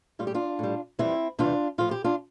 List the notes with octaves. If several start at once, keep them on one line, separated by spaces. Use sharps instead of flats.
A2 G3 F4
G4
D4 F4
A2 G3
F2 E3 G3 C4 E4
E2 C3 E3 G3 D4 F4
A2 F3 F4
G4
D4 F4